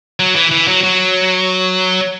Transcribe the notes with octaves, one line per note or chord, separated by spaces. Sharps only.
F#3
E3
E3
F#3
F#3